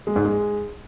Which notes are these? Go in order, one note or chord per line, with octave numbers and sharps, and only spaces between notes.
G#3
G#2
G#3